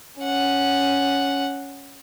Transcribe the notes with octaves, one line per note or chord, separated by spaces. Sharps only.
C#4 F#5